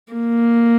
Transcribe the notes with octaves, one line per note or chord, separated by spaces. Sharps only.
A#3